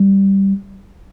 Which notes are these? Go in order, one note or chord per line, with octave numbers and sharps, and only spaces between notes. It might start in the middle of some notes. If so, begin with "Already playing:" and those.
Already playing: G3